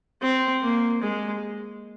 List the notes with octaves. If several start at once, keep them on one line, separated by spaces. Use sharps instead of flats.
C4
A#3
G#3